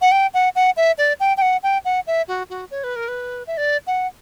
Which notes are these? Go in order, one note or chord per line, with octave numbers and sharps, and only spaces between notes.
F#5
G5
F#5
F#5
E5
D5
G5
G5
F#5
G5
F#5
E5
F#4
F#4
C#5
B4
A#4
B4
E5
D5
F#5